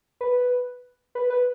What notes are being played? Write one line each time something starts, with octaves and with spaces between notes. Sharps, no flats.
B4
B4
B4